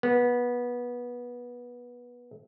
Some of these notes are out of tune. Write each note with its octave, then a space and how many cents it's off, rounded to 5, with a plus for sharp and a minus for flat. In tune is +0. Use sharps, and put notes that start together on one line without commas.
B3 -20